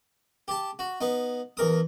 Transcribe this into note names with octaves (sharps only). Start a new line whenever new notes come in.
G4 A5
F#4
B3 D#4
E2 A#4 D#6